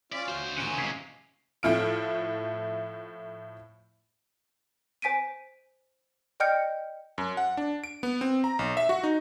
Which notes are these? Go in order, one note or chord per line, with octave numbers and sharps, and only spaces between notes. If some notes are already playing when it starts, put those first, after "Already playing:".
C#4 F4 D5 B6
D2 F#4 C5
A#2 C#4 G#5 F#6 C#7 D7
C3 G#3 G#6 B6 C7
A2 F3 A3 E4 F6 D7
C5 G#5 B6 D7 D#7
D5 D#5 G5 F6 G6 C#7
F#2
F#5
D4
D7
B3
C4
A#5
B1
E5
F#4
D#4